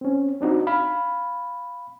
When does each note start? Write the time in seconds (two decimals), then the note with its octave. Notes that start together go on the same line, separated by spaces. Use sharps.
0.01 C4 C#4
0.41 C4 D4 D#4 F#4
0.67 F5 B5